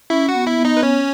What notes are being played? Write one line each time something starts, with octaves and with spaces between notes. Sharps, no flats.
C#4 E4 E5
F#4 F#5
B3
E4 E5
B3
D#4 D#5
B4
C#4 C#5